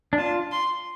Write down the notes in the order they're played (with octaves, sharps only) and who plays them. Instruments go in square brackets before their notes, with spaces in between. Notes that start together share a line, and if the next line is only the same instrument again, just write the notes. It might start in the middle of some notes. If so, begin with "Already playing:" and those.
[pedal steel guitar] D4
[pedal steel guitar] F4 [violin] A5
[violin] C6